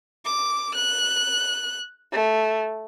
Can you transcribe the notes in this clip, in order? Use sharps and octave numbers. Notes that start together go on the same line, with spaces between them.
D6
F#6
A3